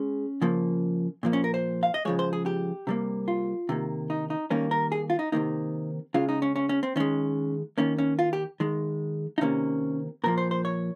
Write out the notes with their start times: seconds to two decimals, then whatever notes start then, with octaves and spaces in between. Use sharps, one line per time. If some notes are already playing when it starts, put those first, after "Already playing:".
Already playing: G#3 C#4
0.42 C#3 F3 A#3
1.23 A#2 F3 A#3
1.33 C#4
1.44 A#4
1.54 C5
1.83 F5
1.94 D#5
2.05 C#3 F3 G#3 C#5
2.19 C5
2.33 G#4
2.46 G4
2.87 C3 G3 A#3
3.28 F4
3.69 C3 D#3 A#3
4.10 D#4
4.30 D#4
4.50 D#3 G3 A#3 C#4
4.71 A#4
4.92 G#4
5.10 F4
5.19 D#4
5.32 C3 D#3 A#3 D#4
6.14 C#3 G#3 F4
6.29 D#4
6.42 C#4
6.56 C#4
6.69 C#4
6.83 C4
6.96 D#3 G#3 C#4
7.78 D#3 A#3 C#4
7.98 C#4
8.19 F4
8.33 G4
8.60 D#3 G#3
9.38 D#4
9.41 C3 D#3 A#3 C#4
10.24 A#2 F3 A#3 A#4
10.38 C5
10.51 C5
10.65 C#5